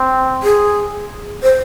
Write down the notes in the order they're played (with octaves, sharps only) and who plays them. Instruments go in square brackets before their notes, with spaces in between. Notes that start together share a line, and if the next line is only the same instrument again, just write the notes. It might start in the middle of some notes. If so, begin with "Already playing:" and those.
Already playing: [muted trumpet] C4
[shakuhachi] G#4
C5